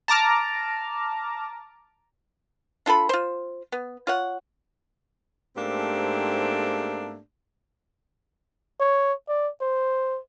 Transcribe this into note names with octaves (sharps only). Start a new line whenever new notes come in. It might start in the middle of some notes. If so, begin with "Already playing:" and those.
A5 A#5 D6 F6
D4 F4 A4 B5
F4 C5
B3
F4 C#5 F#5
G#2 A3 A#3 C4 D4 G4
C#5
D5
C5